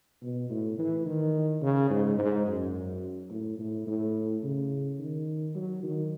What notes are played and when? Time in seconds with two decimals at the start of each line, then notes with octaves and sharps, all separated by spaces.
0.22 B2
0.50 A2
0.78 E3
1.06 D#3
1.62 C#3
1.90 G#2
2.18 G#2
2.47 F#2
3.30 A2
3.59 A2
3.87 A2
4.43 C#3
4.99 D#3
5.55 F#3
5.83 D#3